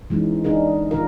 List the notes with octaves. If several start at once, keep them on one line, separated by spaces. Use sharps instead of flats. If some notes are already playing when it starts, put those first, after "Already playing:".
E3 G#3 C#4 D#4
D4 D#4 G#4 A#4
D#3 F4 A#4